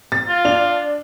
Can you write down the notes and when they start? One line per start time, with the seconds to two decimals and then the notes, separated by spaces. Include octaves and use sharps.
0.12 A6
0.29 F4
0.45 D4 F7